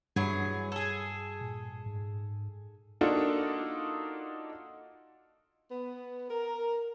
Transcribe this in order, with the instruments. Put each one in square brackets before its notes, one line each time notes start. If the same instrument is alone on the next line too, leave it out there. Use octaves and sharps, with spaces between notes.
[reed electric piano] G2 [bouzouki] E3 F#3 G#4
[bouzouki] G#4 A4
[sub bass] A#2
G#2
[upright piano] A#3 D4 D#4 F4 F#4 A4
[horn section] B3
A#4